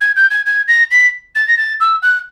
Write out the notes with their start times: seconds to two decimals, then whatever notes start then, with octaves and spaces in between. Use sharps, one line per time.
0.01 G#6
0.16 G6
0.30 G#6
0.46 G#6
0.68 A#6
0.90 B6
1.35 A6
1.48 A#6
1.57 A6
1.80 E6
2.02 F#6